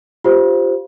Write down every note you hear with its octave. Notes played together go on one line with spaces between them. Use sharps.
F4 G4 C5